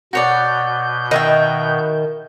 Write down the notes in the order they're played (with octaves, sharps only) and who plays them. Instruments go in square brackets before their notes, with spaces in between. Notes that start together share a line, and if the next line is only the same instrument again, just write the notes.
[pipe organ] B2 G6 [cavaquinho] F#4 C#5 D5
[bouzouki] D#3 [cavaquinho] D#5 E5 G5